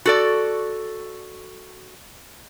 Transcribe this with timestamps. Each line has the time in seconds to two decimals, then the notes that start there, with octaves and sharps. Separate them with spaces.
0.06 F#4 A4 D5